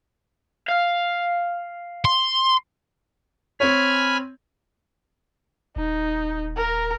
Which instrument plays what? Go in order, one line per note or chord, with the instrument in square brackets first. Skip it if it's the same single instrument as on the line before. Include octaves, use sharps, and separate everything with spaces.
[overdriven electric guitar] F5
[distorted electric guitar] C6
[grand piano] C4 C#5 [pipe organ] G#5 B5 F6
[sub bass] D#1 [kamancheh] D#4
[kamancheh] A#4 A#5